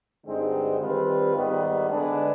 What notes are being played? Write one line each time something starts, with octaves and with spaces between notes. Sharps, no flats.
G2 D3 G#3 C4 D#4
D#3 G3 C4 F4 B4
G#2 D#3 G3 B3
D3 G#3 D4 G#4 B4